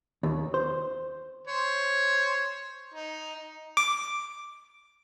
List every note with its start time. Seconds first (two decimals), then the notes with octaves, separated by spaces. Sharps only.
0.23 D#2
0.54 C5
1.47 C5 C#5
2.94 D#4
3.77 D6